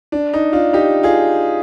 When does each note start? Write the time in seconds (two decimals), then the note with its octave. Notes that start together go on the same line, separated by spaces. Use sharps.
0.12 D4
0.33 D#4
0.53 D4 F4
0.73 D#4 G4
1.03 F4 G#4